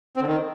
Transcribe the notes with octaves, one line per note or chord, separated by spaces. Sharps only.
C4
D3
D#3